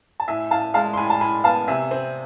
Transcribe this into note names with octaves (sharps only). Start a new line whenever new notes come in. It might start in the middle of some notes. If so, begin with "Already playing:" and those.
A5
A2 E5 G#5
A2 F5 A5
G#3 F5 A5
C6
A2 G#5 B5
A5
A2 G#5 B5
B3 F5 A5
C3 E5 G#5
C4